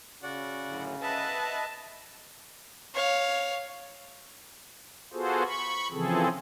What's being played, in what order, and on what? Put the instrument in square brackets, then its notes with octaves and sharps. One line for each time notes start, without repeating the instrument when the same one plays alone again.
[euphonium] C#3 [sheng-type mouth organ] F#4 D5 F#5
[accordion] F#2 A2 D3
[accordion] B4 D#5 E5 [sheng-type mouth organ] F#5 [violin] A5
[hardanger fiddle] C#5 F5
[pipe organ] B3 F4 F#4 G#4 A4 C5
B5 C#6
C#3 E3 F3 C4 G#4 A4